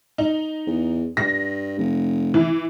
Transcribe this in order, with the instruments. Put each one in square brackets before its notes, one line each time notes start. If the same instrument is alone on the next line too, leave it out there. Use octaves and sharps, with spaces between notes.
[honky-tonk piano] D#4
[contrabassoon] E2
[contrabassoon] G2 [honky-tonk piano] A#6
[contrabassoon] F1
[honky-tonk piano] E3